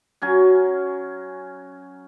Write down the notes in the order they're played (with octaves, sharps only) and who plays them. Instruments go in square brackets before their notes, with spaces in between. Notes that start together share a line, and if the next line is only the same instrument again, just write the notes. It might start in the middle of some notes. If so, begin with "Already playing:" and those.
[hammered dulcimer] F#3 C#4 G#5